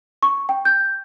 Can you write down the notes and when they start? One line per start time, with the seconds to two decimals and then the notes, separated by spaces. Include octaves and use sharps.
0.23 C#6
0.49 G5
0.65 G6